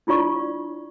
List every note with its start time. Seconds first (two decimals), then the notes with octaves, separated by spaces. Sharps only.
0.07 D4 E4 F4 D5 C#6